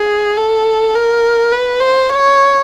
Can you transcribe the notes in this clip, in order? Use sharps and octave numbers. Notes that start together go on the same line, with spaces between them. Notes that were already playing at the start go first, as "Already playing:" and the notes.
Already playing: G#4
A4
A#4
B4
C5
C#5